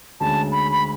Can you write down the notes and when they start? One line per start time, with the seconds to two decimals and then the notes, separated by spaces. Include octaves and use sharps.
0.20 D2 D3 G#3 C#4 A5
0.52 B5
0.72 B5